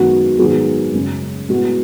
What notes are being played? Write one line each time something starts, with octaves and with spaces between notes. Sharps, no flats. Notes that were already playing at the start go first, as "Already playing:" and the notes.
Already playing: F#2 D#3 G#3 B3 F#4
G#2 D#3 F#3 B3 G#4
F#2 C#3 G#3 C#4
A2 G#3 B3 F#4